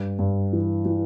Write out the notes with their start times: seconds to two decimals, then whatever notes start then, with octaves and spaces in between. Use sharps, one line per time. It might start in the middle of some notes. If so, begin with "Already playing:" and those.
Already playing: G2
0.19 G2
0.53 E3
0.85 E3